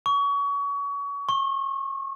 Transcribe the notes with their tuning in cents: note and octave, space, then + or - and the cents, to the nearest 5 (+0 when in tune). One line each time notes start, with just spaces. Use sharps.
C#6 +30
C#6 -35